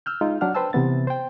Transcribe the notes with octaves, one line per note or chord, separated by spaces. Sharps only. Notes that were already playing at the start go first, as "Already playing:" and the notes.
E6 F6 G6
G#3 D#4 F4
F#3 D4 F#5 F6
B4 C5 G5 A5 E6
C3 E3 B3 A6
C5 G5